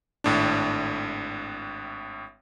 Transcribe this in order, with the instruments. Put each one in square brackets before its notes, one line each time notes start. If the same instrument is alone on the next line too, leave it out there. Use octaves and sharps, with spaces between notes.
[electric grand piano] G#1 A2 D4